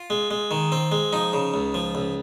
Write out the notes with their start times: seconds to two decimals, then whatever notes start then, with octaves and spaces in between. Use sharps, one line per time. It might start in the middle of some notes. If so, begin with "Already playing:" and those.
Already playing: F4
0.10 G#3
0.31 G#3
0.51 D#3
0.72 C4
0.92 G#3
1.13 F3 D#4
1.33 C#3
1.54 C#2
1.74 F3
1.95 C#2